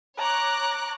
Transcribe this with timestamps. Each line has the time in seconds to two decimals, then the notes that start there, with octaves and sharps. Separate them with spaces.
0.19 C#5 A#5 D6 F#6